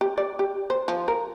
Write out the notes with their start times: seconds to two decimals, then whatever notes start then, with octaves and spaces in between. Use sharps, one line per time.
0.01 G4
0.18 D5
0.39 G4
0.70 C5
0.88 F3
1.08 A#4